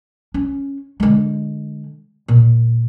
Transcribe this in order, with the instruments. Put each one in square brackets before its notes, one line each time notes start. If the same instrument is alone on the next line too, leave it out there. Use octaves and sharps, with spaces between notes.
[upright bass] C#4
D3 G#3
A#2